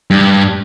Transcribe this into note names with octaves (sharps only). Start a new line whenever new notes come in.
G2